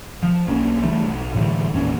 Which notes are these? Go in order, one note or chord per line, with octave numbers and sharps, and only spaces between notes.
F3
B1 A#3 C#4
C#3 E3 G3 A3
B1
A2 D3 E3 G3
G#1 E2 A#2 C#4